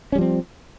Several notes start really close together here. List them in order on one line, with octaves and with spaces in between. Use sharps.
C#4 G3 F3 C4